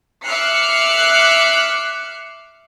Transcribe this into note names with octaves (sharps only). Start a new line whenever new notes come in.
E5 D6 F6 F#6 C7 C#7